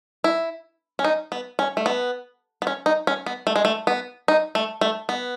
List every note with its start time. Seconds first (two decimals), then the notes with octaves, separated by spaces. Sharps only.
0.24 E4
0.99 C#4
1.04 D#4
1.32 B3
1.59 C#4
1.77 A3
1.86 B3
2.62 B3
2.67 C#4
2.86 D#4
3.07 C#4
3.26 B3
3.47 A3
3.56 G#3
3.65 A3
3.87 B3
4.28 D#4
4.55 A3
4.81 A3
5.09 B3